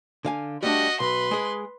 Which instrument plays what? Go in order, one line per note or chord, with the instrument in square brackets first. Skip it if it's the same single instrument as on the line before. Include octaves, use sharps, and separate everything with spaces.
[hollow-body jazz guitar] D3 F5 G#5
[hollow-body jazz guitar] G3 A3 D4 [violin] F#4 D#5
[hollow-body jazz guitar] B1 [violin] B4 C6
[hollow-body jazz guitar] G#3 G#4